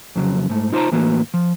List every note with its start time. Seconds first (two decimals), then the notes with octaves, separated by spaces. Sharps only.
0.16 F2 C#3 F#3
0.50 G#2 A3
0.73 D#4 F4 C5 F#5 A5 A#5
0.92 A2 E3 A#3 F#4
1.34 F3